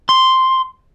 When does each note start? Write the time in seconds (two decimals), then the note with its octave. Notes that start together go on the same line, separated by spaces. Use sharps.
0.09 C6